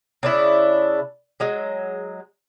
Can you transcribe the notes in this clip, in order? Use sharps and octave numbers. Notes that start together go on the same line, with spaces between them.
C#3 D4 E4
F#3 G#3